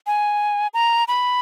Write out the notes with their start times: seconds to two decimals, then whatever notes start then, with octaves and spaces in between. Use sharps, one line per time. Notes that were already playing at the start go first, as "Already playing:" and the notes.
0.07 G#5
0.74 A#5
1.08 B5